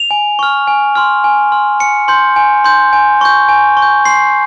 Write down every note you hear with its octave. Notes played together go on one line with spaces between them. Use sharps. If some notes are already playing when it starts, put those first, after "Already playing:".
Already playing: F7
G#5
C#6 F6
G#5
C6 F6
G#5
C6 F6
G#5 C#7
C6 G6
G#5
C6 G6
G#5
C#6 G6
G#5
C#6
G6
C6 C7